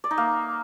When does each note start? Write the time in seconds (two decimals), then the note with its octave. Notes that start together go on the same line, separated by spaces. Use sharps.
0.04 D5
0.11 D#4
0.18 A#3